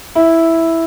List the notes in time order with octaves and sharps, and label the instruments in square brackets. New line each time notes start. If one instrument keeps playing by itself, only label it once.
[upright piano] E4